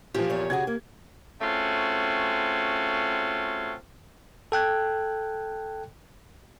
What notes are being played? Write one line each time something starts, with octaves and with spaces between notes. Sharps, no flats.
A#2 F3 G4
E2 C#5
C#3 F#4 G#4 G#6
A#3
A3 C4 C#4 F4 F#4 G#4
A4 G5 F#6 G#6